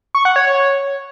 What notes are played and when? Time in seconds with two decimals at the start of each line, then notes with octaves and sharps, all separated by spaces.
0.15 C#6
0.25 F#5
0.36 C#5
0.47 C#5